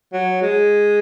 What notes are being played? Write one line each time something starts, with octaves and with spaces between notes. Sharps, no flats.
F#3
G#3